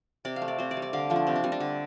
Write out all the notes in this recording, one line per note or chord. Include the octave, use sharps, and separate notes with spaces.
C3 D5
F5
A3
D5
C3 C5
D5
G3
D5
D3 F5
F3 A3
D4
C3 C4
D4
G3 C4
D4
D3